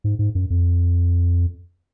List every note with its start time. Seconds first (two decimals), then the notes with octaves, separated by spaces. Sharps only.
0.04 G#2
0.19 G#2
0.35 F#2
0.50 F2